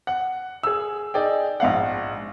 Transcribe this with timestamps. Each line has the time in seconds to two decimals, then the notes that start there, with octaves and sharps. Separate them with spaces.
0.07 F#5
0.63 G#4 E6
1.14 D#4 G#4 D5 G5
1.60 A#1 G#2 F5 F#5